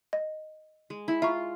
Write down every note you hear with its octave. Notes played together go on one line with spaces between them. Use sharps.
D#5
G#3
E4
F4 E5 A#5 C#6